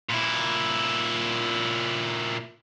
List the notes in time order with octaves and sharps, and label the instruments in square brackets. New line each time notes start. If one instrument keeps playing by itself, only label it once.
[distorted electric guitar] A#2 E4